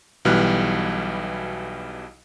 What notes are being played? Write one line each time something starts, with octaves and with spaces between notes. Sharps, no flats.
B1 B2 E3 G3 F6 F#6